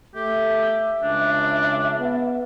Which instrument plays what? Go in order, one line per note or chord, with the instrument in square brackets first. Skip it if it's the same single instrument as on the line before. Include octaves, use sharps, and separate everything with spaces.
[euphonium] A3 [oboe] G4 [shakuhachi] E5
[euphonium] C#2 [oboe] D4
[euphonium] B3